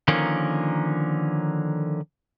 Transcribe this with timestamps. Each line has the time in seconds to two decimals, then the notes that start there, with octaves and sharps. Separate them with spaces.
0.08 D3 D#3 F3 A#3 C#4